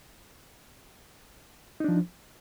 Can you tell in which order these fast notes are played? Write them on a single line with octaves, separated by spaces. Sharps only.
D#4 D4 F3